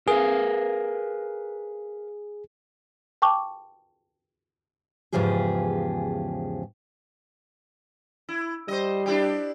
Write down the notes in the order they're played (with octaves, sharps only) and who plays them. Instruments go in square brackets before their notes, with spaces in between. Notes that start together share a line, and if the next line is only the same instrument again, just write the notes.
[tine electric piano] G#4 [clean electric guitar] A#4 B4 F5
[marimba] G5 A5 C#6 D6
[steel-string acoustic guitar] E2 G#2 C#3 F3 G4 G#4
[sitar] E4
[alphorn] G3 [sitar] C5 D#5
[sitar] D4 E4 G4